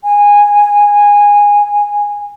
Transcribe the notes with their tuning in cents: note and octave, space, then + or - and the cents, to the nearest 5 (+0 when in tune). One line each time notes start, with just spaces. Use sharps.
G#5 -10